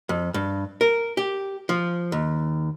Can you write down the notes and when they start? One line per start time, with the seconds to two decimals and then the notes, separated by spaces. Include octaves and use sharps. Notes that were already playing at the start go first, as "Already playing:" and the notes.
0.09 F2
0.34 G2
0.81 A#4
1.17 G4
1.69 F3
2.12 D#2